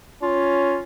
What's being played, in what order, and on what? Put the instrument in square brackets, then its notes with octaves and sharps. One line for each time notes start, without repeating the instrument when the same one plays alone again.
[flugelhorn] C#4 [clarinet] F4